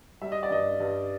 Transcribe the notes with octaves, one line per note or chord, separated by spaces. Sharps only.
G3 E5
D#5
D5
G2 D#5
G2